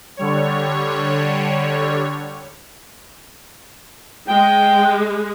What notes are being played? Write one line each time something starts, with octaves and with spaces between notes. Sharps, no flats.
D3 G3 C#5
G#3 G5